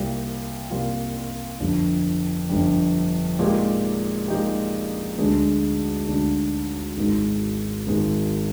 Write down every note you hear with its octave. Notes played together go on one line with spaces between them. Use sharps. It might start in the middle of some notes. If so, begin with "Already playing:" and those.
Already playing: C2 C3 G3 A#3 F4
C2 C3 G3 A#3 F4
G1 F2 D3 G3
G1 F2 D3 G3
A#2 G#3 D#4 G4
A#2 G#3 D#4 G4
D2 D3 G#3
D2 D3 G#3
G#1 G#2 D#3 G#3
G#1 G#2 D#3 G#3